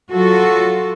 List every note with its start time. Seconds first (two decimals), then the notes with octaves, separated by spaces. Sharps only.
0.11 F#3 F4 F#4 A4